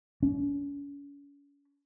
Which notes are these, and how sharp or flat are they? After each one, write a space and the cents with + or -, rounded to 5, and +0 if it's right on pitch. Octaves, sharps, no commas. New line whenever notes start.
C#4 +40